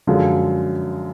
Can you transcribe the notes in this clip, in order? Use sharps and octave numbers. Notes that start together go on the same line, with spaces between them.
F#2 D3 F3 G#3